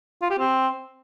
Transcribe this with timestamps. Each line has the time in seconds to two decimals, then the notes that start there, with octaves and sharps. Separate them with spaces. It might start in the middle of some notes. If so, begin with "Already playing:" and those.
0.22 F4
0.30 G4
0.39 C4